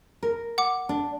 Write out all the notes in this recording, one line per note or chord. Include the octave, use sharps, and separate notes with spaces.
A#4
F#5 D6
D4